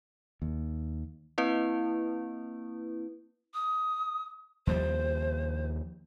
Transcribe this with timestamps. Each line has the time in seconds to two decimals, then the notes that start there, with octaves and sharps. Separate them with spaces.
0.42 D#2
1.38 A#3 C4 E4 B4
3.54 D#6
4.67 D#2 F3 G3 C5